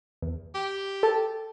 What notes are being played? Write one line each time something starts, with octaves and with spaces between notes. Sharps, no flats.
E2
G4
A4 A5